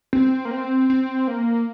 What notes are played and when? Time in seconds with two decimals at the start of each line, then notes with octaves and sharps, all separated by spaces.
0.13 C4
0.45 A#3
0.51 C4
0.90 C4
1.28 A#3